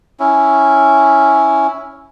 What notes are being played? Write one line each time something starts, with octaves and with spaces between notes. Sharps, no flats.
C#4 E4